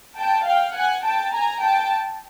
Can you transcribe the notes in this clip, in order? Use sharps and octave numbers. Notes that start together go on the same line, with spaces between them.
G5 A5
F5 G5
F#5 G#5
G5 A5
G#5 A#5
G5 A5